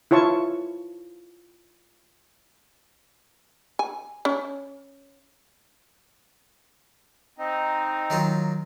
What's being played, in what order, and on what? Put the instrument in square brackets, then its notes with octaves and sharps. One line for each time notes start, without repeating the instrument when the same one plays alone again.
[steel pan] E4 F4 C#5 A5 C#6
[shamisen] G#5
C#4
[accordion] C4 D#4
[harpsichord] D#3 F#3 F4